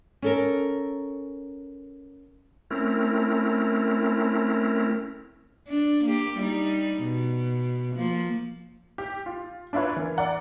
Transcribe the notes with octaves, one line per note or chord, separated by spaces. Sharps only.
C#4 A4 A#4
A3 C4 C#4 E4 A#4
D4
A#3 G4
G3 D#4
B2
F3 A#3
G4
F4
D4 E4 F4 B4 C#5
E3 A#4
D5 F#5 A#5